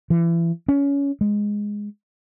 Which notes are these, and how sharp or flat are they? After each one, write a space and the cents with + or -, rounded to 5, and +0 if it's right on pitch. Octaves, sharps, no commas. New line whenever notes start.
E3 +30
C#4 +20
G#3 -5